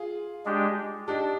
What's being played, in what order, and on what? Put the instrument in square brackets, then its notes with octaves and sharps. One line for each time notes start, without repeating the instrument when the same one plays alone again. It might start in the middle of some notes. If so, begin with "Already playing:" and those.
Already playing: [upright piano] F4 G#4
[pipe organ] G#3 D4 G4
[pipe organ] D4 [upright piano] D#4 G4